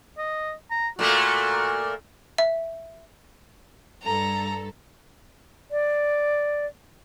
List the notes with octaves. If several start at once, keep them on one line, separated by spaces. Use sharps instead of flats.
D#5
A#5
A#2 A3 A#3 F#4
E5
G2 A4 A#5
D5